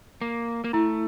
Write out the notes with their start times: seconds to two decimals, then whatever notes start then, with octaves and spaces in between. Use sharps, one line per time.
0.21 A#3
0.64 A#3
0.73 A3 E4